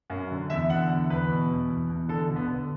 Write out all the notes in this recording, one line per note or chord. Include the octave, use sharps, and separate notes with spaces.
F#2
D3
E2 E5
D3 F#5
E2
E2 B4
B2
E2
E2
E2
D3 A4
D3
B3
D3